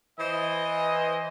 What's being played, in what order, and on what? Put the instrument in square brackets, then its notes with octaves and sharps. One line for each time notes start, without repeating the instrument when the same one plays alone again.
[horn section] E3 C5 D#5